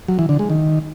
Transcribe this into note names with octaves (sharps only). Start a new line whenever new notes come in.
F#3
E3
D3
G#3
D#3